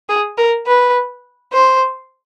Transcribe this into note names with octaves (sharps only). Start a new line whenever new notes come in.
G#4
A#4
B4
C5